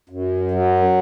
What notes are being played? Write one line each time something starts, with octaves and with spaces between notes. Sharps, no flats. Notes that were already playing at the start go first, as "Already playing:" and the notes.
F#2
F#3